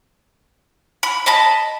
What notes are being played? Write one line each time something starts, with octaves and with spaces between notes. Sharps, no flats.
B5
D#5 A5 B5